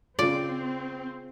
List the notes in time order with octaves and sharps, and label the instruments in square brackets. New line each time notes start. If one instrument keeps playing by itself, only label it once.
[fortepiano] C#3 F4 [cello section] C4 [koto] D5